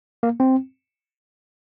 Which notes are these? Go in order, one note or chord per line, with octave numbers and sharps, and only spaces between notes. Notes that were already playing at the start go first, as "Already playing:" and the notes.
A#3
C4